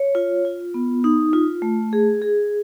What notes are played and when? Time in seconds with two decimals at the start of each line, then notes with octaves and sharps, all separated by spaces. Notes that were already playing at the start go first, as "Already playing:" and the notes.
Already playing: C#5
0.15 F4
0.45 F4
0.74 B3
1.04 D#4
1.33 F4
1.62 A3
1.93 G#4
2.22 G#4